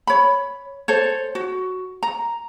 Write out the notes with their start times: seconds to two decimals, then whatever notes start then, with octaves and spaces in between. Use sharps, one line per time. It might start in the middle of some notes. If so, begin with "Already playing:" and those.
0.07 C#5 B5
0.88 A4 C5 C#5
1.35 F#4
2.03 A#5